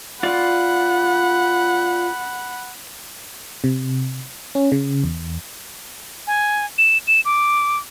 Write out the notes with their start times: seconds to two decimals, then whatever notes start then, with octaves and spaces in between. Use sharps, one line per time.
0.23 F4 D5 F#5 B5
3.64 C3
4.55 C#4
4.72 C#3
5.04 E2
6.27 G#5
6.78 E7
7.07 E7
7.25 D6